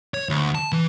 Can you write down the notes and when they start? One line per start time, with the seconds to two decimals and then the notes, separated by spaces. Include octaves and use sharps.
0.14 C#5
0.29 D2
0.55 A5
0.72 E3